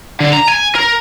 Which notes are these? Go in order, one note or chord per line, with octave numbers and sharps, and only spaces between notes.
D3
A#5
G#5
A#4